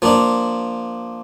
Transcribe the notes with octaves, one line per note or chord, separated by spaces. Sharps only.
F3 A#3 D4